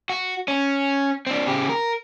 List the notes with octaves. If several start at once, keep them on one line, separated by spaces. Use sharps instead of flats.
F#4
C#4
C4 D4
C#3 G4
A#4